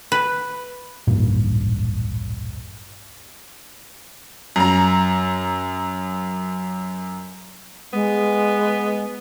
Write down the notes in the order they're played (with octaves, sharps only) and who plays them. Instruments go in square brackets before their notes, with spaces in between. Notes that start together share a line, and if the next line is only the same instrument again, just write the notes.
[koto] B4
[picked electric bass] D1 A1 G2 A#2
[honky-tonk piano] F#2 A#5
[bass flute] G#3 [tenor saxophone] B3